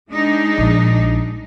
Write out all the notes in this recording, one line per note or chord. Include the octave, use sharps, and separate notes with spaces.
G#3 D4 D#4
A#1